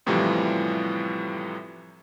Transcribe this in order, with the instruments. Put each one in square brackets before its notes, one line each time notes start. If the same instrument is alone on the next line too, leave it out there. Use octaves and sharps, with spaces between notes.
[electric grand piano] F#2 A2 C3 E3 F3 G3